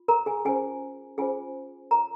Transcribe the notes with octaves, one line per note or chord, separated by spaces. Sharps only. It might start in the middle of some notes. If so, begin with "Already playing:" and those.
Already playing: F4
A#4 A#5
G#4 G#5
C#4 F4 G#4 C5 G#5
C#4 F4 G#4 C5 G#5
F4 A#4 C#5 A#5